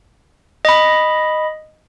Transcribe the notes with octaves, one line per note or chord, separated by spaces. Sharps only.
D#5 B5